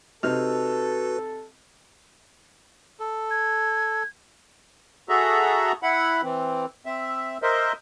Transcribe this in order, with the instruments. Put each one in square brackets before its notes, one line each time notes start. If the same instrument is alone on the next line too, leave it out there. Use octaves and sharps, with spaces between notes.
[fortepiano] C3 D#4 F6 [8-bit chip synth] F#4 B4 [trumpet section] A4
[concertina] A4
[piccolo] G#6
[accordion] F#4 G#4 A4 E5 A#5
E4 F#5 B5
E3 C4
C4 E5
A#4 C5 D#5 E5